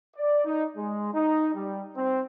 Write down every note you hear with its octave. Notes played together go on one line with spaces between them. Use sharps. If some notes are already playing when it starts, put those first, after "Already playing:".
D5
D#4
G#3
D#4
G3
C4